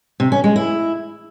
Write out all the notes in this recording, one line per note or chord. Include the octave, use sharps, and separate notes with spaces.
C3
C#4
G#3
E4